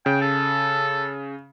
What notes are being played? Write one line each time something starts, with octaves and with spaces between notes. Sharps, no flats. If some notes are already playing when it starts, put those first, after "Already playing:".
C#3 G5
A4